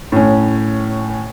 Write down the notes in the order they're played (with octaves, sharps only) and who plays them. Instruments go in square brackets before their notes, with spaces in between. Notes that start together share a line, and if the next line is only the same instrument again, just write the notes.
[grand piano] A2 C#4